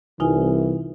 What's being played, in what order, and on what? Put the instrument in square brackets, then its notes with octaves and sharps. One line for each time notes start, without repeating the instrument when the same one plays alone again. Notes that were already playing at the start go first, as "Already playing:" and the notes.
[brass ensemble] C2 [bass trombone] E3 [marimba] D#4 F4 G#5